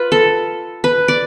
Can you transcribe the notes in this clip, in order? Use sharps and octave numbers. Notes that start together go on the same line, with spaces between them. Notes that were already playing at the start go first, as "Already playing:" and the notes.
Already playing: F4 B4
A4
B4
D5